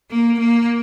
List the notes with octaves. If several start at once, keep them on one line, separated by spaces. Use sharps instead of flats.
A#3
A#3